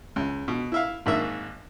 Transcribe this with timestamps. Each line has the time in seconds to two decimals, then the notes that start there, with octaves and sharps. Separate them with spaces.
0.16 C#2
0.48 B2
0.72 E4 E5 F5
1.06 G#1 G#2 A#3 E5